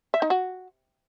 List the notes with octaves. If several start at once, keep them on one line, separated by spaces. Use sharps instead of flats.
E5
D#4
F#4